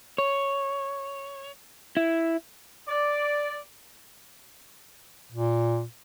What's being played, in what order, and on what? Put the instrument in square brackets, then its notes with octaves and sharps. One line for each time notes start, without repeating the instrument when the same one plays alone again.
[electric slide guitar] C#5
E4
[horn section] D5
[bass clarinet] A#2